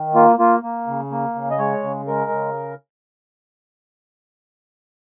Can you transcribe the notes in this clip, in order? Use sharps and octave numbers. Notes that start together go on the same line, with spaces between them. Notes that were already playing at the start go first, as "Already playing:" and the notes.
Already playing: D#3
A#3 F4
A#3 F4
A#3
C#3
A#3
C#3
D#5
G#3 C#5
C#3
G#3 A#4
C#3